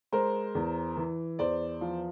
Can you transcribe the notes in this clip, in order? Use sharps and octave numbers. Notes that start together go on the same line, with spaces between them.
G#3 A#4 C5
E2
E3
E2 C5 D5
F3